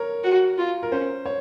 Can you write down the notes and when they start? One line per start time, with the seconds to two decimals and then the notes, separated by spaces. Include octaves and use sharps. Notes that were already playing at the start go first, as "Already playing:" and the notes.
Already playing: A#4 C#5
0.24 F#4
0.58 F4
0.83 A#4
0.92 C#4 C5
1.26 C#5